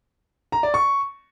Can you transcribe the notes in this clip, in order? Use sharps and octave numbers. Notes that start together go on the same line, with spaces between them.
A#5
D5
C#6